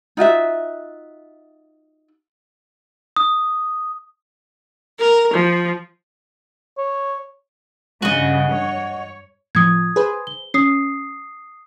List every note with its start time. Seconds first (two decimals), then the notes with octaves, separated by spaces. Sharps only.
0.17 D#4 F4 F#4 E5
3.16 D#6
4.99 A#4
5.35 F3
6.78 C#5
8.02 G2 C#3 F#4 D#5
8.52 C#5
9.55 A2 F3 D#6 G#6
9.96 G#4 B4 C5
10.27 G7
10.54 C#4 D#6 C7